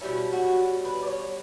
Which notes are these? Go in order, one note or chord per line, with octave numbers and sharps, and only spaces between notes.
B2 G3 C#4 E4
F#4
B4
D5
C#5